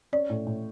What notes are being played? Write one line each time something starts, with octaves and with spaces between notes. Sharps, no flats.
C#4 D5
A2
A2